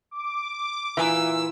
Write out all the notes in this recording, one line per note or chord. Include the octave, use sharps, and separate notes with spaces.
D6
A#2 E3 E4 F4 G#5 E6